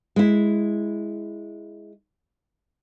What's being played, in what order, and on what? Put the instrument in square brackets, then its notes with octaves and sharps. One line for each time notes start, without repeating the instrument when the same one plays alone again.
[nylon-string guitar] G#3 E4